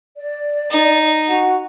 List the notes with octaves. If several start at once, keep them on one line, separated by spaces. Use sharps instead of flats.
D5
D#4
F#4 F#5